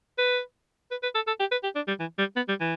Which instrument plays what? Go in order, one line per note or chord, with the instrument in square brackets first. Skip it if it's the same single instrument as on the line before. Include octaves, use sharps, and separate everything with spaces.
[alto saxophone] B4
B4
B4
A4
A4
G4
B4
G4
D4
G3
E3
G3
B3
G3
E3